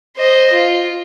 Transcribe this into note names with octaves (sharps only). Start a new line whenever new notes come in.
C5 D#5
F4